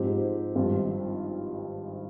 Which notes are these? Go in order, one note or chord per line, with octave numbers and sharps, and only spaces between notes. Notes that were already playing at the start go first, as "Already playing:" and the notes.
Already playing: G#2 F3 C4 G4
G#1 G2 F3 C4 F4